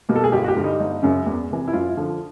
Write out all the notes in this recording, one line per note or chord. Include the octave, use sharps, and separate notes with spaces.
B2 G3 A#3
A4
G#4
G1 G4
F#4
G4
G2 D3 G3
D#4
G1
F#2 C#3
E2
C3 E3
E4
F#2 F4
D3 F3